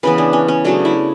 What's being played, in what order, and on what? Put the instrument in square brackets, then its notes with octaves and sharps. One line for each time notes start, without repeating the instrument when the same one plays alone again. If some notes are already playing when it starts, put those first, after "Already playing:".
[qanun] C#3 E3 B3 B4
D4
C#4
C#4
C#3 F#3 A3 D4
E4